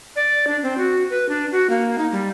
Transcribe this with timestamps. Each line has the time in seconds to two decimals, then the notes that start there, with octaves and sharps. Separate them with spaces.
0.16 D5
0.47 D4
0.63 C4
0.78 F#4
1.10 B4
1.29 D4
1.52 F#4
1.70 A#3
1.98 D#4
2.12 G3